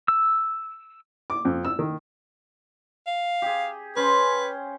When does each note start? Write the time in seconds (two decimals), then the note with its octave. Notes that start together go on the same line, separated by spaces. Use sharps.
0.08 E6
1.30 D6
1.45 F2
1.65 E6
1.79 D#3
3.07 F5
3.42 G4 G#4
3.96 C#4 B4 C5